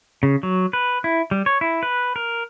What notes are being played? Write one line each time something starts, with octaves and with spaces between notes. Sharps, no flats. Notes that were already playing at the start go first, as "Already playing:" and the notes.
C#3
F#3
B4
E4
G3
C#5
E4
B4
A#4